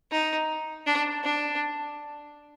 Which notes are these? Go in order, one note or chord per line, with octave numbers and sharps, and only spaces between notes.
D#4
D4
D4